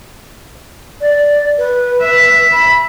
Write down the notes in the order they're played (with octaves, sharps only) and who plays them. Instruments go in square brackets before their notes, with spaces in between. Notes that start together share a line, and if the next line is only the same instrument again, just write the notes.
[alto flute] D5
B4
[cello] E5
[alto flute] B5